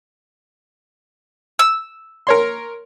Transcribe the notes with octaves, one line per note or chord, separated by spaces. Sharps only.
E6
A#4 C#5 C6